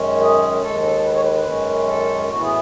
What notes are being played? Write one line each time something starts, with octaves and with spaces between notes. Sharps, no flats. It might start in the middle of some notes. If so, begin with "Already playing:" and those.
Already playing: F#2 D#3 G#3 C#4
G#4
D#2 D#3 G#3 A4
A4
B4
C#5
B4
B4
F#2 D#3 G#3 C#4
A4
A2 E3 B3 F#4
G#4